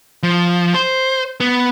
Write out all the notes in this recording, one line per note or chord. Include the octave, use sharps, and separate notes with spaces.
F3
C5
B3